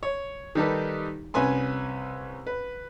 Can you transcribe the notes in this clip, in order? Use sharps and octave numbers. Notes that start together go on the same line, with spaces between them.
C#5
D#3 G3 D#4 G4 A4 B4
C2 C#4 B4 G#5 C6
B4